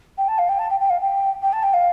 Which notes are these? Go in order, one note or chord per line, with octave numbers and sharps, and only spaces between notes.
G5
A5
F5
G5
A5
G5
G5
F5
G5
G5
A5
G5
F5